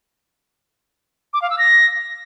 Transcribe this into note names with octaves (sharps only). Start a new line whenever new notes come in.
D6
F5
E6
A#6